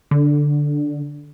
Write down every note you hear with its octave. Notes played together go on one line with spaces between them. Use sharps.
D3